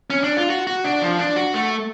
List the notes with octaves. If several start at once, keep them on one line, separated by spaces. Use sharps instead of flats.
C#4
D4
F4
F#4
F#4
D4
F3
D4
F#4
A3